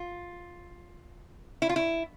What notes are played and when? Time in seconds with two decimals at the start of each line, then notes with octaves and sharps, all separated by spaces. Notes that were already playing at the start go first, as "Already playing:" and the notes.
Already playing: F4
1.62 E4
1.69 F4
1.76 E4